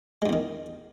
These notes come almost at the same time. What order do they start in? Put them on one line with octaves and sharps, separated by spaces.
G#3 G2 E2 D#3